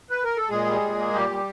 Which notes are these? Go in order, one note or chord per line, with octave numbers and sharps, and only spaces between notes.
B4
A#4
A4
A#2 G#3 G#4
G3
A#2
A#3
A#2 G3 G4
G3